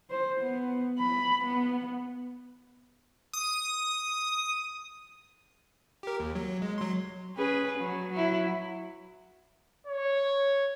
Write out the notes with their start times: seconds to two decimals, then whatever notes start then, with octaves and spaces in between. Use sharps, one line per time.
0.10 C5
0.41 B3
0.99 B5
1.45 B3
3.33 D#6
6.03 G4 A#4
6.20 D#2
6.35 F#3
6.62 G#3
6.78 F#3 C6
7.37 C#4 G#4 B4
7.78 F#3
8.12 F#3 E4
9.87 C#5